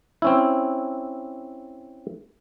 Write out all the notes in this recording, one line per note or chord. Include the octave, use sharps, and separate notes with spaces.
C4 C#4 E4